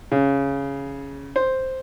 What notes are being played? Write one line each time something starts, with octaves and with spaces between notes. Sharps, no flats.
C#3
C5